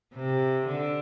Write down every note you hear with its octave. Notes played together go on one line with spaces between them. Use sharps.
C3
D3